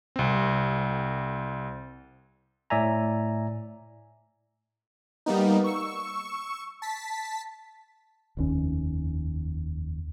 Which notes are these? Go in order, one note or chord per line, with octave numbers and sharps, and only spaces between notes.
C2 C4
A2 D5 E5 G#5 A#5
G3 A#3 B3 D#4
C#6 E6
A5 B6
F1 D#2 C#4